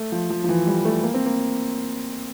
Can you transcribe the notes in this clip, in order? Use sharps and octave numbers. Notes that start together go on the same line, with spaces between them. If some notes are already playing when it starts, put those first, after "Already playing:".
Already playing: A3
F3
F3
F3
E3
G3
A3
A#3
C4
A#3